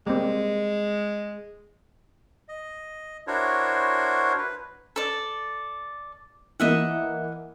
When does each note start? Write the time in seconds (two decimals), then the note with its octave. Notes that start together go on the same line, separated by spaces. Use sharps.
0.07 G3 G#3 A#3 C4
2.49 D#5
3.27 D4 E4 F#4 A#4 C5 C#5
4.38 B4
4.96 A4 D5
6.60 E3 A#3 E4 D#5 E5 F#5